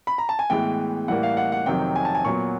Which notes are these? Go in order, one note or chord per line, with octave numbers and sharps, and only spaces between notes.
B5
A#5
A5
G#5
A2 E3 G#3 B3 G5
A2 E3 G3 A#3 F#5
F5
F#5
F#5
F2 C3 D#3 F#3 G5
G#5
A5
G#5
A#2 F#3 B3 C#6